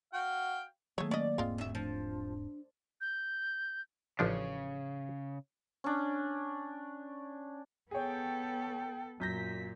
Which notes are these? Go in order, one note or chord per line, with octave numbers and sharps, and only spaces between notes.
F#4 F5 G5
D#3 F#3 A3 A#3 G#4 C#5
C#4 D5 D#5
E1 G#2 G#3 C4 F4
D2 E5
F3 D4
G6
A1 C#3 F3 D4
C#4 D4
B3 G#4 A4 C#5 G5
F#2 A#2 G6 A#6 B6